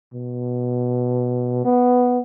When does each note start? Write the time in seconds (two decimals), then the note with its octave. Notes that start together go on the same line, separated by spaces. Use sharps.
0.14 B2
1.64 B3